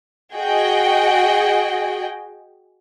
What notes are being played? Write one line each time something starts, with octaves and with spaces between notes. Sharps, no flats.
F#4 G#4 D#5 G5